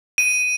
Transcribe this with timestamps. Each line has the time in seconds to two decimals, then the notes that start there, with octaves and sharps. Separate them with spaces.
0.18 D#7